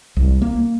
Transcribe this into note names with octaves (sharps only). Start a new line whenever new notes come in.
C2
A#3